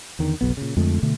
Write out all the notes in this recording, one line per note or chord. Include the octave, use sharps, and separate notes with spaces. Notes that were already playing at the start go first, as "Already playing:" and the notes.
E2 D3 D#3
F#1 B1 B3
A#2 C#3
F2 D3 G#3 A3
B2 D3 A3